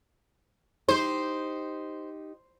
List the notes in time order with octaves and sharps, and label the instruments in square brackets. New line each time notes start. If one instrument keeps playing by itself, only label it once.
[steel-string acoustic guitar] D#4 G4 [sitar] C5